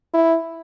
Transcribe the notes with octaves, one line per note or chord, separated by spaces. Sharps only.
E4